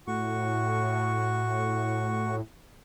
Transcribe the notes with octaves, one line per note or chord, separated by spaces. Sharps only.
A2 F#4 C#6